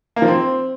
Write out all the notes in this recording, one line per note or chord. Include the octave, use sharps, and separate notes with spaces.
A#3
F3
C4